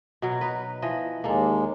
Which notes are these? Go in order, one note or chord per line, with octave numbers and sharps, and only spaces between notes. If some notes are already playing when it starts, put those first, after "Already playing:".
B2 F#3
D#4 B4
E3 F3 D#5
D#2 G#3 A#3 D4 A4